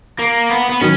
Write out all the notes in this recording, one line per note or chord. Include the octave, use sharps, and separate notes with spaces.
A#3
B3
B3
D#3 F#3 C#4